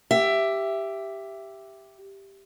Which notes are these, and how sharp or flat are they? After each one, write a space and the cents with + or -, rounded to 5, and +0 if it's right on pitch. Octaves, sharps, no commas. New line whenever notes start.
G4 +0 E5 +10